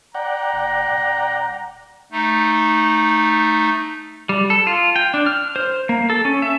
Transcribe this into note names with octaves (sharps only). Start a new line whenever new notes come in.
D5 F#5 G5 A#5
F1
D#1
A3 D#4
G3
A4
F4
G5
D4
F6
C5
A#3
A4
C#4
E5